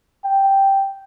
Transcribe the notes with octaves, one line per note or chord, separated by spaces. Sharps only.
G5